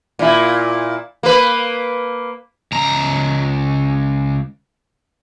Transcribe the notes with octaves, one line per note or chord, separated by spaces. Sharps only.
A#2 E4
A#3 B4
C#2 A#5